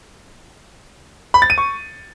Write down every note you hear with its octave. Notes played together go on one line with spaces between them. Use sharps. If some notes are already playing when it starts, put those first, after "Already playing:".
B5
A6
D#7
C#6